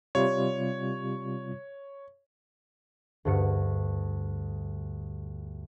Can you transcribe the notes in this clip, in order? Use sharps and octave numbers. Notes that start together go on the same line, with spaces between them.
C3 G3 F4 C#5
D2 G2 C#7